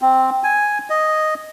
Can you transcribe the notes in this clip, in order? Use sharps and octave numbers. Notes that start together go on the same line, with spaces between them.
C4
G#5
D#5